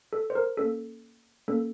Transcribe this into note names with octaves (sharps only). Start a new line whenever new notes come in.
A4
C5
A#4
A#3 C#4 A4
A#3 C#4 A4